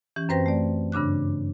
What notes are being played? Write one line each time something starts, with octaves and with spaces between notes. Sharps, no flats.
E3 C#4 G4
F#2 C4 B4 C5 G5 A#6
A3 D5
G2 C#3 D4 D6 F#6